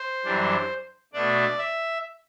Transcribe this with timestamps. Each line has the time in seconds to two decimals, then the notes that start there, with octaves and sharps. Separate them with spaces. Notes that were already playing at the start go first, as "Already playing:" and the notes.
Already playing: C5
0.24 F#2 E3 G3 D4
1.13 B2 A3 D4 D5
1.58 E5